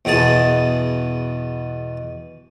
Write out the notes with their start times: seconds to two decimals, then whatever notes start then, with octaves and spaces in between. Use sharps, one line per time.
0.05 E2 B2 B3 G#4 A5